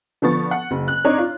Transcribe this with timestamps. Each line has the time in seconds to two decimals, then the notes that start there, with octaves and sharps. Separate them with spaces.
0.22 D3 F3 B3 C#6 A6
0.51 F#5
0.71 F#1
0.88 F#6
1.04 C4 D4 D#4 C#5 D5 A#5
1.18 F4